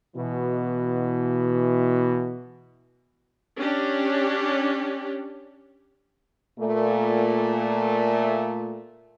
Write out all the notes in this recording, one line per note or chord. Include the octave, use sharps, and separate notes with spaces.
B2 E3
C#4 D4 G4
A#2 A3